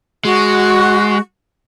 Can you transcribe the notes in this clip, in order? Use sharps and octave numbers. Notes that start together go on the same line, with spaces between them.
G#3 F#4